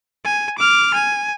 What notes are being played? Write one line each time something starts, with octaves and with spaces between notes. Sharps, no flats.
G#5
D6 F6
G#5